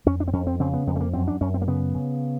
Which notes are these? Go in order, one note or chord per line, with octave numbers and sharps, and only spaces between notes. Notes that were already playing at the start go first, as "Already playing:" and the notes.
F2 C#4
D4
C4
F2 C#4
C4
C#3 C4
B3
F2 B3
A3
A#3
F#2 C4
D4
F#2 C#4
C4
A#3
C#3 B3
C#3